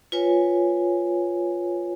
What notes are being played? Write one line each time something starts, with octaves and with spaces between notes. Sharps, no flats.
F4 B4 C#5 G#5